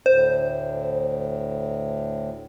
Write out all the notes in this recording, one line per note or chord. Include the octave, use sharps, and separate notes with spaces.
D2 A2 C5